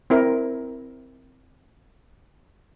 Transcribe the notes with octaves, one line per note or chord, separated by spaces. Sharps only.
C4 E4 A#4